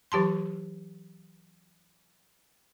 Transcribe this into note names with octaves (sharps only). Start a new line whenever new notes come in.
E3 F#3 G4 A5 C6